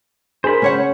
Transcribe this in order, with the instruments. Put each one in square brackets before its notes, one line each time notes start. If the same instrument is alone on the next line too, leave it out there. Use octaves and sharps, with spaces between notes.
[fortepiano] G#4 A#4 [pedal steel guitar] C5 B5
[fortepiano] C#3 [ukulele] C#4 C#5 F#5